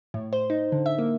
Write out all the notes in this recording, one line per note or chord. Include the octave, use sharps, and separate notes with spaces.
A2
C5
D#4
D3
E5
A#3